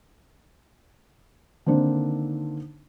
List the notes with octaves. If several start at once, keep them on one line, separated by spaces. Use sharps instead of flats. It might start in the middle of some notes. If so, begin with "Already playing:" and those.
D3 D#3 A#3 C4 D4 D#4